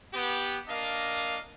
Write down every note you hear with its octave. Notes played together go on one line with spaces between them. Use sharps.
B3 G4
A#3 D4 D#5 F5